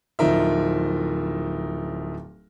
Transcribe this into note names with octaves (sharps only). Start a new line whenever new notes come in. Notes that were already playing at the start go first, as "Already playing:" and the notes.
D1 F3 D#4 A#4 E5